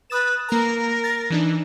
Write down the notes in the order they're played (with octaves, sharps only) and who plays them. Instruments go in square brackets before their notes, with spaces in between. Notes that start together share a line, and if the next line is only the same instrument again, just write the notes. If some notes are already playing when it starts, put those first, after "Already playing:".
[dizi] B4 [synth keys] D#6 A6 E7
[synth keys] A#3 A#5 [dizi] A#4
[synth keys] A6 A#6
E3 D4 D#4